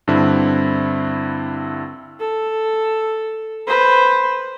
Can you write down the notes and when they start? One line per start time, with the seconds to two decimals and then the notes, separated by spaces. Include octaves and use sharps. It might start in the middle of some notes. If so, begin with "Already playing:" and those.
0.08 G2 D3 C4 E4
2.20 A4
3.67 B4 C5